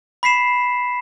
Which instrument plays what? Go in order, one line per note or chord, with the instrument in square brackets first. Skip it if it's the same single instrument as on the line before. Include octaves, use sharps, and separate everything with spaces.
[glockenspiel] B5 B6 C7 E7